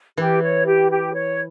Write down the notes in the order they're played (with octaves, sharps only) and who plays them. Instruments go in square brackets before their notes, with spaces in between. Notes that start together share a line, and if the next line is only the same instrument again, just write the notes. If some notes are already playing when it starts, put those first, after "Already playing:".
[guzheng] E3 [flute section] G4
[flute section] C#5
G4
G4
C#5